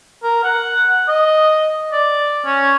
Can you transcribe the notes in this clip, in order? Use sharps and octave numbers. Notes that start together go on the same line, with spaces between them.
A#4
F#5
D#5
D5
C#4